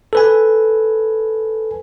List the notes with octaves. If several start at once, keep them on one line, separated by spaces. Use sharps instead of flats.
A4 B4 G#5